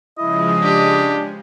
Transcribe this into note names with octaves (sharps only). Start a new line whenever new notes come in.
C#3 F3 G#3 E4 D#5
D4 G4